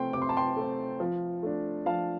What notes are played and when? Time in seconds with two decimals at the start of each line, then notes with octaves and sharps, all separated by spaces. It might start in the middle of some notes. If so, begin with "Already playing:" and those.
Already playing: C3 A3 C4 G5 C6
0.13 C3 D6
0.22 C6
0.29 A5
0.37 G5 C6
0.57 A3 C4
1.00 F3
1.43 A3 D4
1.86 F3 F5 A5